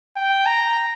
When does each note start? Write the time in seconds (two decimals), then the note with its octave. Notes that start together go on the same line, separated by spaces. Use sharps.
0.17 G5
0.46 A#5